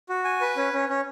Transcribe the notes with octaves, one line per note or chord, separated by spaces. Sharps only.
F#4
G#5
B4
C#4
C#4
C#4